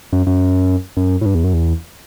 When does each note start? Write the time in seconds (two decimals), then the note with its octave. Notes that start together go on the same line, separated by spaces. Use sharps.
0.13 F#2
0.27 F#2
0.97 F#2
1.21 A2
1.26 G2
1.35 E2
1.44 F#2
1.54 E2